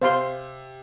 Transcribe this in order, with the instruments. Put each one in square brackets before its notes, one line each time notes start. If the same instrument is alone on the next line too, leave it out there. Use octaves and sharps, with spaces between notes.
[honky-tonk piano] C3 [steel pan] C5 F5 C6